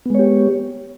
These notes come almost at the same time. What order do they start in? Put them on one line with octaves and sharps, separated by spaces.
B3 G#3 C#5 G4